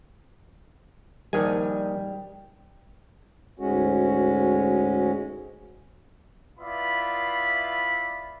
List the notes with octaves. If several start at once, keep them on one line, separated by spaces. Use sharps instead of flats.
A#1 D#3 G3 G#5
D2 G#2 G#3 C#4 F#4
B3 E4 F4 D5 E5 B5